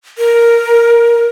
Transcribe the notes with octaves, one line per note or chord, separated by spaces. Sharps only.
A#4